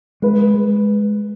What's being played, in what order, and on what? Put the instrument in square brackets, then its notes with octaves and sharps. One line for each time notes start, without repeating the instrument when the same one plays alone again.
[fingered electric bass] G#3 [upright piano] B4
[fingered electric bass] G#3